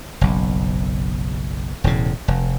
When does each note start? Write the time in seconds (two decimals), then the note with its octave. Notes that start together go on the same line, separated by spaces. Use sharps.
0.21 F#1 B1
1.84 E1 A2 C#3
2.28 F1